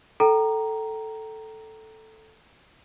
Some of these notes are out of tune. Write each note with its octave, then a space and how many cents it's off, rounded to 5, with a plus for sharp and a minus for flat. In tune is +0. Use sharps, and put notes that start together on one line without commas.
A4 +0 G5 -30 A#5 +0